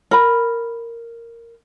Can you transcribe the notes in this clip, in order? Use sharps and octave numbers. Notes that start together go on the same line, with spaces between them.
A#4 B5